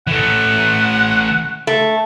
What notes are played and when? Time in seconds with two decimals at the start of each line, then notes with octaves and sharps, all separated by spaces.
0.07 E3 A3 F#5
1.67 A3